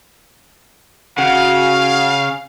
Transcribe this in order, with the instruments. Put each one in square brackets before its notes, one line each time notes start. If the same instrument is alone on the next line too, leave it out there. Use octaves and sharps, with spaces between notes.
[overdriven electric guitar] C#3 [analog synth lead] F#4 [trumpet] F5